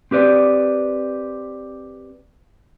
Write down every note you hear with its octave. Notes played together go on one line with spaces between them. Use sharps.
C4 G4 B4 D5